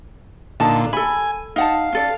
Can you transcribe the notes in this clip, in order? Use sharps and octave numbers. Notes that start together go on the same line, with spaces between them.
A#2 D3 D#4 A5
A4 G#5 B5
D#4 F5 F#5 A5
C#4 A4 D5